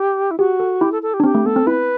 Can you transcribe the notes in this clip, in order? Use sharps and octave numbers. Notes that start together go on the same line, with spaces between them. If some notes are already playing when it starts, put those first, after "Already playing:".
Already playing: G4
E4
F#4 G4
A4
E4 G4
A4
A4
G4
D4
C4 G4
A3
B3 A4
C4
E4 B4